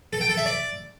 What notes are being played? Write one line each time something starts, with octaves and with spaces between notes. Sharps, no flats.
A4
G5
A4
E5
D5